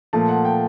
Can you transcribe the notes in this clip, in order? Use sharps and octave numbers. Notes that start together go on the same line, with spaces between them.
A#2 F3 A3 A5
F#5
G5